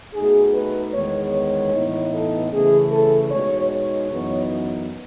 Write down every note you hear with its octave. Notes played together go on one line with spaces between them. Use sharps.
B2 A3 D#4 G#4
B4
E2 D#3 G#3 B3 C#5
C#5
A2 E3 B3 D#4
A4
C#3 E3 A3 C#4 G#4
A4
B2 G#3 D#4 C#5
C#5
F#2 E3 B3 D#4